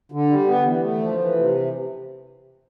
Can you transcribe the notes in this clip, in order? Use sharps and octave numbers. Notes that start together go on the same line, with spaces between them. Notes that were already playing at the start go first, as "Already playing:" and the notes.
D3
G3
B3
E3
A3
F3
E3
C3